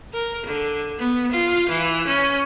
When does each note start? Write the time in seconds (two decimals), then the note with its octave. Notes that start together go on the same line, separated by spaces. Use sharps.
0.14 A#4
0.46 D3
0.99 B3
1.31 F4
1.69 E3
2.07 C#4